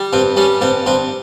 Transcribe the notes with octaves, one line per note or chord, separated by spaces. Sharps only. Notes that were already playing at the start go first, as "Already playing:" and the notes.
Already playing: G3
G2 C4
G3 C#4
G2 C4
G2 C4